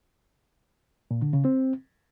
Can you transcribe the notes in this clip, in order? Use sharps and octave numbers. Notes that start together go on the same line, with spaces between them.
A#2
D3
C#3
C4